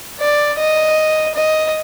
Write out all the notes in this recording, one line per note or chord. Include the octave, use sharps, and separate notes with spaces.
D5
D#5
D#5